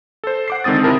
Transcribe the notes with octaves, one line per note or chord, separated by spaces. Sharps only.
A4 C5
F#5 D6 C7
D3 D#3 G#3 C4 D#6 A6
C3 E4 A#4 A5